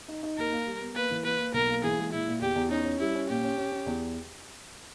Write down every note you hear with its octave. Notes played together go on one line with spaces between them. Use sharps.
D#4
D#4
D#2 A#4
A#3
G3
B3
A#3 B4
E3
A#3 B4
A#3
B1 A#4
A#3
E3 G#4
G#3
A#2 E4
A#2
E2 G4
E2
C#4 D#4
C#4
G3 E4
C#4
A#2 G4
C#4
C#4
C#4
E2